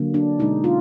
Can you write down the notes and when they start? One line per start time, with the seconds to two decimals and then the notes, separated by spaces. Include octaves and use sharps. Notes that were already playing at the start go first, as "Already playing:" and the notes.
Already playing: D3 F#3 A#3
0.14 D4
0.39 B2 G#3 D#4
0.64 F4